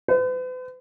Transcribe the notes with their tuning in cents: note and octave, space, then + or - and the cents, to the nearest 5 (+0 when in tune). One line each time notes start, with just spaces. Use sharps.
B4 +45